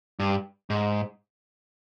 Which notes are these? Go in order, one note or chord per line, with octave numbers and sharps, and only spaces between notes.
G2
G#2